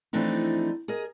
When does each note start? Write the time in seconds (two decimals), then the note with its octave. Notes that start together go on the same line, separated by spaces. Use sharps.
0.13 E3 F3 A3 C4 D4 D#4
0.88 G#4 A#4 D#5